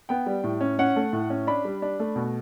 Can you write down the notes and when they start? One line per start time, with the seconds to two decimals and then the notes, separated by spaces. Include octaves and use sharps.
0.09 B3 G5
0.26 G3
0.44 A2
0.61 C#4
0.79 C#4 F#5
0.96 A3
1.13 A2
1.30 C#4
1.47 D4 B5
1.65 G3
1.82 D4
2.00 A3
2.16 B2